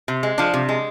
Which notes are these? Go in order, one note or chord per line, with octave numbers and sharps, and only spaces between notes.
C3
G#3
F3 D4
C3
G#3